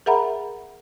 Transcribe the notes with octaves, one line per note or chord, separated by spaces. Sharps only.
G#4 A#4 E5 F#5 A#5 B5